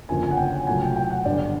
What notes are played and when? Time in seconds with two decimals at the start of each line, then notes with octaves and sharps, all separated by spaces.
0.09 G1 F2 C#3 F3 A#3 G#5
0.23 G#5
0.31 F#5
0.37 G5
0.67 C2 A#2 F#3 A3 G#5
0.81 G5
0.96 G5
1.11 F#5
1.25 G1 G2 D3 G3 D5